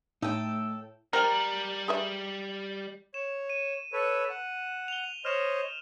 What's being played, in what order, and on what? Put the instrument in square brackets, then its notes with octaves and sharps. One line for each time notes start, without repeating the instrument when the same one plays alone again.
[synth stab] A2 [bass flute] A3 [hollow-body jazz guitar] D#4 D#5 [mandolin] A4 G5
[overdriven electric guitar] G3 [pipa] A#4 [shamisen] C5 G5
[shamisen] G#4 B4 E5
[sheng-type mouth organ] C#5 [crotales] E7
[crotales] D#7
[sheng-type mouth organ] A4 B4 C#5
F#5
[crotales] F7 G7
[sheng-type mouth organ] C5 C#5 D#5 [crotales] F6 E7 F7